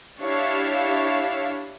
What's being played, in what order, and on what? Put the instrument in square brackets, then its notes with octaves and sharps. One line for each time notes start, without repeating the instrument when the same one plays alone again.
[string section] D4 E4 G4 C#5 F5